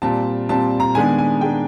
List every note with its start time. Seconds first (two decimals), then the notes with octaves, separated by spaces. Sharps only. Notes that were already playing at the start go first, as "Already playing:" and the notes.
0.02 A#2 G3 C4 A5
0.49 A#2 G3 C4 A5
0.80 A#5
0.95 D#3 G#3 B3 D4 G#5
1.18 G#5
1.41 D#3 G#3 B3 D4 G5